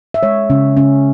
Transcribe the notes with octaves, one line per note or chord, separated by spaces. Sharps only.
E5
G#3 C#5
C#3 C#4
C#3 C#4